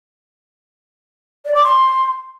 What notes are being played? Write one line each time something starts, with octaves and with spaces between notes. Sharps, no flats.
D5
D6
C6